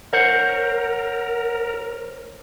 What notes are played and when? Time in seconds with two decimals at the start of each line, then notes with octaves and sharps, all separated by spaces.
0.13 A#4 C5 C#5 F#5